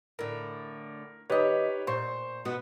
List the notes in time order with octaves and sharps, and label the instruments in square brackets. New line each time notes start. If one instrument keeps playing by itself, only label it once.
[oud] A2 D3 [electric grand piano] A#4
[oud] D#3 D#5 [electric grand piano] G4 B4 C#5
[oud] A#2 [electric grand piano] C5 C6 C#6
[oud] B2 B3 F#4